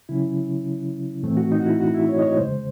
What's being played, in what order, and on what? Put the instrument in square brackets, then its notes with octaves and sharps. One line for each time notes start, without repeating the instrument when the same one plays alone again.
[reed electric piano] C#3 F#3 C#4 E4
A2 E3 A3 C4
F#4
D#4
F#4
E4
F#4
E4
C#5
D#5
C#5
E2 C#3 G#3 C5